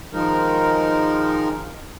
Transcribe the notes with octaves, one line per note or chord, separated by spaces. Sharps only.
D#3 F3 G#3 D#4 A#4